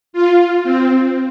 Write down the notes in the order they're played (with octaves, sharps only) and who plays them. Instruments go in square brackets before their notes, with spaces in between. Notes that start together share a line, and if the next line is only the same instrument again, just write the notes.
[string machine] F4
C4